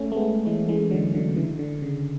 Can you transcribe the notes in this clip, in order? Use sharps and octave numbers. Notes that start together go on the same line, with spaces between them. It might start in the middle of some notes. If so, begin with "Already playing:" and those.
Already playing: A3 C#4
A3
G#3 B3
E3 G#3
E3 G#3
D3 F#3
D3
C#3 E3
D3
C#3